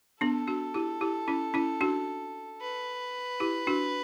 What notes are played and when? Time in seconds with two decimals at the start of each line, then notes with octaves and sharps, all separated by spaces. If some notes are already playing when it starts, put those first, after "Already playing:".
0.21 B3 D4 A4
0.47 D4 F#4
0.74 E4 G4
1.01 E4 G4
1.28 C#4 E4
1.54 C#4 E4
1.81 D4 F#4
2.61 B4
3.40 E4 G4
3.67 D4 F#4